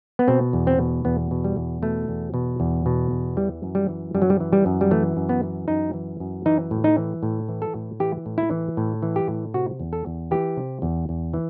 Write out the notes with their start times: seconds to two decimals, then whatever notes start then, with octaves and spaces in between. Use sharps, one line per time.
0.19 B3
0.28 B2 C4
0.53 E2
0.67 C4
0.79 B2
1.05 E2 B3
1.31 B2
1.44 G3
1.56 E2
1.82 B2 A3
2.08 E2
2.34 B2
2.60 E2
2.86 B2
3.11 E2
3.37 E3 G3
3.63 F#2
3.75 G3
3.89 E3
4.15 F#2 G3
4.22 F#3
4.30 G3
4.40 E3
4.53 G3
4.66 F#2
4.81 G3
4.91 E3 A3
5.17 F#2
5.29 B3
5.43 E3
5.68 F#2 D#4
5.93 E3
6.20 F#2
6.46 E3 D#4
6.71 A2
6.84 D#4
6.97 E3
7.23 A2
7.49 E3
7.62 A4
7.75 A2
8.00 E3 G4
8.26 A2
8.38 E4
8.51 E3
8.77 A2
9.02 E3
9.16 G4
9.28 A2
9.54 C3 F#4
9.80 E2
9.93 A4
10.06 E2
10.31 E3 G4
10.57 C3
10.82 E2
11.09 E2
11.34 E3